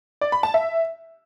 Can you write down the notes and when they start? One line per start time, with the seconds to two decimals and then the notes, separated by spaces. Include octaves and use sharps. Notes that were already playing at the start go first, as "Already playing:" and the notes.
0.21 D5
0.32 B5
0.43 A5
0.54 E5